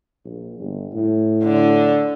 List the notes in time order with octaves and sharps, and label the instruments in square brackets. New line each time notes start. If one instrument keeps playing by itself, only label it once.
[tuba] A#1
G1
A2
[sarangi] D3